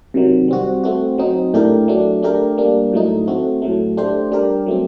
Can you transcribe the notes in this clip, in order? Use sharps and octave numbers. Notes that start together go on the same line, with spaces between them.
C3 D#3 F#3
G3 C4 F#4
A3 C4 F#4
F#3 C4 D#4
A2 A3 D4 G4 A#4
F#3 A3 D4
A3 D4 G4 A#4
G3 A#3 D4
A2 F#3 A3 D#4
A3 C4 F#4
A2 F#3 A3
A3 D4 G4 C5
G3 D4 G4 A#4
F#3 A3 C4